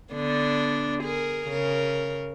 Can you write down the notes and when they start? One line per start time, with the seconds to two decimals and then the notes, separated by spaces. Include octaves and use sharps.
0.13 D3 B3 D4
1.03 G#4 A#4
1.48 C#3 A#4